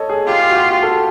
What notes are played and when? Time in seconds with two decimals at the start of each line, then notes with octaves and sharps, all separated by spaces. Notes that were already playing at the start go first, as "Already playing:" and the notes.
Already playing: A4 C#5 D#5
0.09 G#4
0.27 F4 G4
0.41 G4
0.50 F#4
0.55 G4
0.82 A4